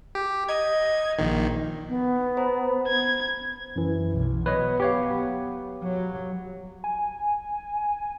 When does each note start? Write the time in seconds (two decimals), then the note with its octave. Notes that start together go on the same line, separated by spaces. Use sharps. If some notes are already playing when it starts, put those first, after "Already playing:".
0.15 G4
0.49 D#5 G#6
1.19 A#1 D#3
1.89 B3
2.37 C5 A#5 B5
2.87 G#6
3.76 F#2 E3
4.12 B1
4.46 F#3 B3 B4 C#5 D#5
4.80 G4 C#5 F5
5.84 F#3
6.84 G#5